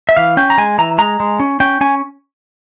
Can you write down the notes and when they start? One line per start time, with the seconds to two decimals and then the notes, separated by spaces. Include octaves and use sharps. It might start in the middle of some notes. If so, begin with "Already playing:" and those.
0.09 E5
0.17 E3 F5
0.37 C#4 G5
0.50 A#5
0.58 G#3 G#5
0.78 E3 A#5
0.98 G#3 A#5
1.20 G#3
1.40 C#4
1.60 C#4 G5
1.81 C#4 G#5